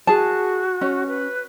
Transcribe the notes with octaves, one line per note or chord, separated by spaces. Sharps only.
F#4 G#4 A5
C#4
B4